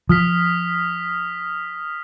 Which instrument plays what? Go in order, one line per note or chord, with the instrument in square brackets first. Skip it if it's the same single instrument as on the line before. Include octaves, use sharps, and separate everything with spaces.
[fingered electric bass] F3 [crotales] D#6 F6 B6